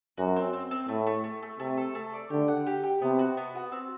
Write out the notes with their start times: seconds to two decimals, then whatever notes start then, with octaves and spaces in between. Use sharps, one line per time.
0.18 F#2 F#4
0.36 C4
0.53 C4
0.71 C4
0.89 A2 A3
1.07 A3
1.24 A3
1.43 A3
1.60 C3 A3
1.77 A4
1.95 A3
2.14 D5
2.30 D3 G4
2.48 F#5
2.67 G4
2.83 G4
3.02 C3 B3
3.19 F#4
3.37 B3
3.55 F#4
3.72 C4